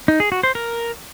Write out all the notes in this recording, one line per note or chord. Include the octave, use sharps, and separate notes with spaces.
D#4
G#4
F#4
C5
A#4